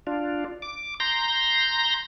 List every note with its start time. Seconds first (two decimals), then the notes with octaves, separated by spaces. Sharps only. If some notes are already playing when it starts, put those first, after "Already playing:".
0.07 D4 F4
0.62 D6
1.00 A#5 C6 G6 A#6